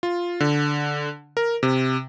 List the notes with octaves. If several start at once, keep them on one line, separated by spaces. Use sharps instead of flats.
F4
D3
A#4
C3